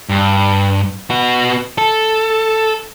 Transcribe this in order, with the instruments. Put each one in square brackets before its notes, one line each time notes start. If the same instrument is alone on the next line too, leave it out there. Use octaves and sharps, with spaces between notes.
[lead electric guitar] G2
B3 F#4
A4